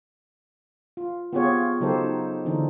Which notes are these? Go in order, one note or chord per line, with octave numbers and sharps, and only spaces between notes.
F4
B3 C4 F4 G4 G#4 C#5
F4
C#3 F#3 D#4 G4 A4 C5
D#4
D3 E3 C4 D4 D#4